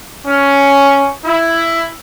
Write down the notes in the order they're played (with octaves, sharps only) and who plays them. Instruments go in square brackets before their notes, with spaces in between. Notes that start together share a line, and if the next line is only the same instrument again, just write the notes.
[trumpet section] C#4
E4